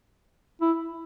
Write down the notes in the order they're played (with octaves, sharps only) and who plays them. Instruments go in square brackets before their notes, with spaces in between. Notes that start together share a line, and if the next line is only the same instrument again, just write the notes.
[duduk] E4